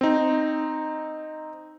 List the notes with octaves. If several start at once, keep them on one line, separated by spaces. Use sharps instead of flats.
C4 D#4